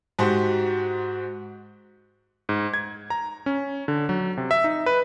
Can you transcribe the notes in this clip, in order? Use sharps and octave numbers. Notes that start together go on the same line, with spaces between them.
G#2 F#4 G4 C5
G#2
G#6
A#5
C#4
D3
F#3
C3
E5
D#4
B4